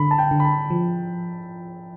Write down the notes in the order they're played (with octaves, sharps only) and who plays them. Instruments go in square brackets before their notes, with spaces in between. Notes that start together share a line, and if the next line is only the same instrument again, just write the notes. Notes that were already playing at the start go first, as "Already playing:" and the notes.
Already playing: [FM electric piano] D3 [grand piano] B5
[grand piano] A5
G5
[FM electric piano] D3
[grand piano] B5
A5
[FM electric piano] F3